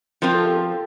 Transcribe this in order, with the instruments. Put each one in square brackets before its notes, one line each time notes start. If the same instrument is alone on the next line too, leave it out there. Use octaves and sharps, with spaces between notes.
[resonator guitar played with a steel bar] F3 C4 F4 [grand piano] A#4
[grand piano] A4
G4
A4